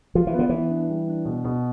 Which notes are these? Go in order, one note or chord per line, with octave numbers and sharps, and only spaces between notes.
F3 F4
E3
B3
D3
E3 B3
D4
G3
D4
B2
B2